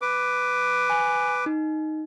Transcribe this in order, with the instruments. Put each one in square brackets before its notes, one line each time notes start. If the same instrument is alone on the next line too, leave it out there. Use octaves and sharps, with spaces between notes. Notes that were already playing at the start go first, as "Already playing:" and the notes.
[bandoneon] B4 D6
[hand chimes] G#5
D#4